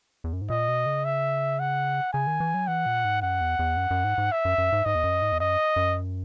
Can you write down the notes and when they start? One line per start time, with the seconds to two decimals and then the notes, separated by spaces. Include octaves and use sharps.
0.24 E2
0.33 F#2
0.41 G#2
0.50 A#2 D#5
0.68 B2
0.86 C#3
1.05 E5
1.59 F#5
2.13 C#3 G#5
2.27 D#3
2.40 E3
2.54 F#3
2.67 E3 F#5
2.86 A#2
3.04 G#2
3.22 F#2 F#5
3.41 E2
3.59 E2
3.77 F#2
3.91 F#2
4.04 G#2
4.18 G#2
4.32 E5
4.45 F#2
4.58 F#2
4.72 G#2
4.85 G#2 D#5
4.95 E2
5.04 F#2
5.22 G#2
5.32 E2
5.40 F#2 D#5
5.76 F#2